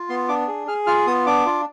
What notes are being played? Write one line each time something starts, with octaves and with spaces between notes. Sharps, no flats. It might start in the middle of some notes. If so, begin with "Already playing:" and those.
Already playing: F4
B3 C6
D4 D6
G#4
G#4 F6
F4 F6
B3 D#6
D4 D6
F4